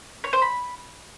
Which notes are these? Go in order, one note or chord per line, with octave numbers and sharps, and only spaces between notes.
C#5
C5
B5